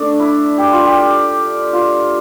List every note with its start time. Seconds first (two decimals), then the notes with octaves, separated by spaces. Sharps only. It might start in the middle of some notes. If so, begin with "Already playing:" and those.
Already playing: A3 D4
0.19 E4
0.58 G4
0.72 F4
0.86 G4
1.73 F4